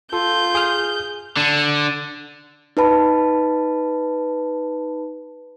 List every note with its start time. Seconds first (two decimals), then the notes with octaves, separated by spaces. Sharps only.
0.13 F4 A4 G6
0.55 G#4 D#6 F6
1.37 D3
2.77 D#4 B4 A5 B5